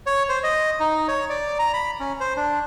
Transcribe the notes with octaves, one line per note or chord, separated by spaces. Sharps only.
C#5
C5
D#5
D#4
C#5
D5
A#5
B5
C#4
C5
D4